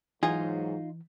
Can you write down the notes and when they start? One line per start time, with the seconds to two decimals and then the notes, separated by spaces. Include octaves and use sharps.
0.23 G#2 E3 F#3 D#4 F4 G#4